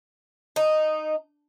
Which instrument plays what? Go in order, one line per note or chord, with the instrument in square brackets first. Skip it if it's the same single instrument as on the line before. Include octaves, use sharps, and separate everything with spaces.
[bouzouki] D#4